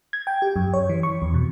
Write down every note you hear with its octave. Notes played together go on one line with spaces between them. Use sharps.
G#6
G5
G4
F#2
C#5
E3
C#6
E2
B2